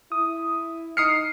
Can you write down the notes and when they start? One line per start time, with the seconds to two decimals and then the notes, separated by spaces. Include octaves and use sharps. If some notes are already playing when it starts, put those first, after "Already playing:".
0.12 E4 D#6
0.97 D#4 D#6 F6 C7 C#7